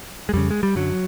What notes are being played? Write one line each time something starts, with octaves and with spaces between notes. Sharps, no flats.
G#3
F2 C#3 G3
G#3
G3
F#2 D3 F#3